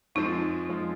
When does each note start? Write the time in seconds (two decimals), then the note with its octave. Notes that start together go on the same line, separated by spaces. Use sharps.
0.15 F2 F3 G#3 D#4 F4
0.69 F2 F3 G#3 F4